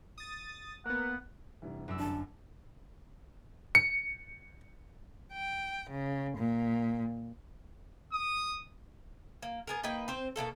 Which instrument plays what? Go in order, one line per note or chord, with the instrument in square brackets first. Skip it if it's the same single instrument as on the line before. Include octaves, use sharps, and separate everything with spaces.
[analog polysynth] D#6 A6
[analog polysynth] A#3 B3 [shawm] F#5
[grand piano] F1 G2 E3
[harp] F#2 D5 E6
[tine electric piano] G1 D4 [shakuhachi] A5
[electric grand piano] C#7
[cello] G5
C#3
A#2
[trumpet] D#6
[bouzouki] A#3
B3 G#4 A#4
A#3 D#4 B4 G5
C4 C5
B2 E3 A#3 A4